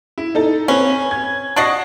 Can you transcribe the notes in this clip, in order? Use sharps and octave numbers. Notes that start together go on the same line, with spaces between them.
E4
D#4 A4
C4 C#4 B4
G#6
D4 F#4 D#5 A5 C7